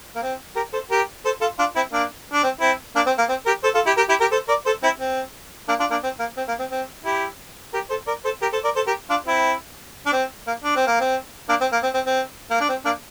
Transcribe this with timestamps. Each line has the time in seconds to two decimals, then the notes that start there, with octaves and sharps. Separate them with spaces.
0.16 A#3
0.23 C4
0.56 G4 A#4
0.73 A4 C5
0.90 G4 A#4
1.25 A4 C5
1.41 F4 A4
1.59 D4 F4
1.76 C4 E4
1.92 A#3 D4
2.33 D4
2.43 C4
2.60 C4 E4
2.95 A#3 D4
3.06 C4
3.18 A#3
3.29 C4
3.46 G4 A#4
3.63 A4 C5
3.75 F4 A4
3.86 E4 G4
3.97 G4 A#4
4.09 E4 G4
4.20 G4 A#4
4.32 A4 C5
4.48 A#4 D5
4.65 A4 C5
4.83 C4 E4
5.00 C4
5.68 A#3 D4
5.79 D4 F4
5.91 A#3 D4
6.03 C4
6.19 A#3
6.37 C4
6.48 A#3
6.59 C4
6.71 C4
7.05 E4 G4
7.73 G4 A#4
7.90 A4 C5
8.07 A#4 D5
8.24 A4 C5
8.42 G4 A#4
8.53 A4 C5
8.64 A#4 D5
8.76 A4 C5
8.87 G4 A#4
9.10 D4 F4
9.26 C4 E4
10.06 D4
10.12 C4
10.47 A#3
10.64 D4
10.76 C4
10.87 A#3
11.00 C4
11.49 A#3 D4
11.61 C4
11.72 A#3
11.83 C4
11.94 C4
12.06 C4
12.51 A#3
12.60 D4
12.69 C4
12.85 A#3 D4